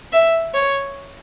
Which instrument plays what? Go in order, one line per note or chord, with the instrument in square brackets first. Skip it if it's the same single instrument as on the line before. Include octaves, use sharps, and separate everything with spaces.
[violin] E5
C#5